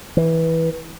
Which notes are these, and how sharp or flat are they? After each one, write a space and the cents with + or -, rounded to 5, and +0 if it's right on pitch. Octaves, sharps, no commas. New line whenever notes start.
E3 -15